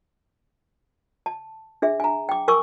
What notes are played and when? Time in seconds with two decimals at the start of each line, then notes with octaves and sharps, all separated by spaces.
1.26 A5
1.82 D4 G#4 E5
2.00 G#5 A#5
2.29 G5 D6
2.48 A#4 G#5 C#6 D6 E6